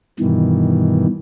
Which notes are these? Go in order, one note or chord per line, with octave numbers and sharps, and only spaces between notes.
G2 B2 D#3 E3